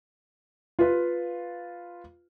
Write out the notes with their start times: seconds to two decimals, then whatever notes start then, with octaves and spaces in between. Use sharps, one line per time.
0.79 F4 B4